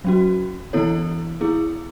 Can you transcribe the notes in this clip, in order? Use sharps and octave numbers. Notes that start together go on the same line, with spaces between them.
F#3 C#4 F#4
E3 B3 E4 A4 C#5
B3 E4 G#4